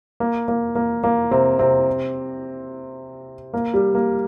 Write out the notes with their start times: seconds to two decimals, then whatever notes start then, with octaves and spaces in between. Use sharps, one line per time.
0.20 A#3
0.48 A#3
0.75 A#3
1.04 A#3
1.31 C3 C4
1.59 C3 C4
3.54 A#3
3.74 G3
3.95 A#3